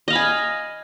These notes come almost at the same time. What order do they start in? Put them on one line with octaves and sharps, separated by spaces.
D#5 F5 B5 G#5